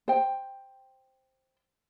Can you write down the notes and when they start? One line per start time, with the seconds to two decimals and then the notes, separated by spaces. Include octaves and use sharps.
0.08 C5 G5